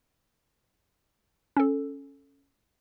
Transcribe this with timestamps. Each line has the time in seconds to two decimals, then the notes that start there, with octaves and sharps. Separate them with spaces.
1.57 C#4 A4